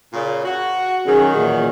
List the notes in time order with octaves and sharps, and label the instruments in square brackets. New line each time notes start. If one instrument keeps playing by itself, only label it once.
[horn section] A#2 C#3
F#4
[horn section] B2 D#3 F#3 [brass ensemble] C#4 F#4 G#4
[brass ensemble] E2 A#2